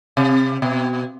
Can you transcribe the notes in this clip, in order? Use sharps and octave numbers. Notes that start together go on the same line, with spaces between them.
C3
B2